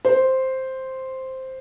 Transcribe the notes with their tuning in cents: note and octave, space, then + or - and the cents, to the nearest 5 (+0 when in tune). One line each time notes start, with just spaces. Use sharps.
C5 +0